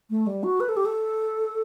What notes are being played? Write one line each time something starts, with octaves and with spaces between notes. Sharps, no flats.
A3
G3
F#4
B4
A4
G4
A4